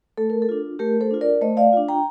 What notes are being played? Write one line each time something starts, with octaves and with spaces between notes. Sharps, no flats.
A3 A4
A#4
A4
D4 F4
A3 G4 A#4
A4 C5
D4 F4
A#4 D5
A3 C5 D#5
D5 F5
D4 F4
G5 A#5